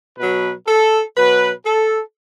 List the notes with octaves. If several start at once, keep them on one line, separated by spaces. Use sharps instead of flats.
B2 F#3 B4
A4
B2 F#3 B4
A4